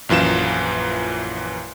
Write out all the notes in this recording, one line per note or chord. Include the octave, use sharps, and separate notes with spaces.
A#1 F#2 E3 F4 E7